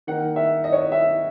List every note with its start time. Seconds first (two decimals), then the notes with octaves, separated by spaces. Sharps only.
0.07 D#3 A#3 F#5
0.36 E5
0.64 D#5
0.72 C#5
0.80 D#5
0.92 E5